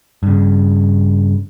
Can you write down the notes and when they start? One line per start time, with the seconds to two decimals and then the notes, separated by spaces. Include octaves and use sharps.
0.23 G2 C#3